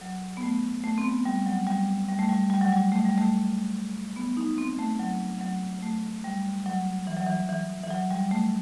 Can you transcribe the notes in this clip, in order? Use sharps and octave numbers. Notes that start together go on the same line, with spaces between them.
F#3
B3
A3
A3
C4
B3
G3
F#3
G3
G3
A3
G3
G3
F#3
G3
A3
G3
A3
B3
D#4
C4
A3
F#3
F#3
A3
G3
F#3
E3
F#3
E3
E3
E3
F#3
G3
A3